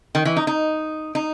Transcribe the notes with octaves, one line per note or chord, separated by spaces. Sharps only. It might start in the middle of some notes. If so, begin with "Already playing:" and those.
D#3
E3
D#4
D#4
D#4